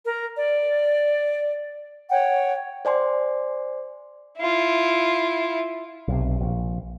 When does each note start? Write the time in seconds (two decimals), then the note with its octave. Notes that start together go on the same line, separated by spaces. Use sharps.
0.03 A#4
0.36 D5
2.10 C#5 F#5 G5
2.85 C5 D5 G#5 C6
4.39 E4 F4
6.08 B1 C3
6.40 A#1